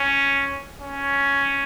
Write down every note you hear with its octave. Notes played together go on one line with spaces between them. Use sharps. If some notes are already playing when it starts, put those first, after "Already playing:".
Already playing: C#4
C#4